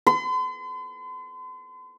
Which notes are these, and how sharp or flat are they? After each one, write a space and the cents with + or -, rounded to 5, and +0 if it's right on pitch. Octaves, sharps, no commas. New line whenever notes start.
C6 -45